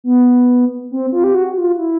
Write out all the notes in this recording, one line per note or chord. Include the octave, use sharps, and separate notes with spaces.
B3
C4
F4
G4
F#4
F4
E4